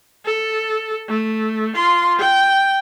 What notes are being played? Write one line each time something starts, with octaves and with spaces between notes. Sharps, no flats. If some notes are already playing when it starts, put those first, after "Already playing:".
A4
A3
F4 C6
G5